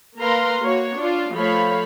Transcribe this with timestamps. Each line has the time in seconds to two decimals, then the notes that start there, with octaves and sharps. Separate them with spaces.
0.19 A#3 A#4 B4 F5 A#5 C6
0.61 A#3 F#4 C#5
0.98 D4 F4
1.33 F3 A3 C#5 F5 B5